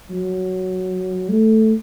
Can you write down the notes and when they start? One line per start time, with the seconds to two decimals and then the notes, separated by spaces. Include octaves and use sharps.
0.11 F#3
1.29 A3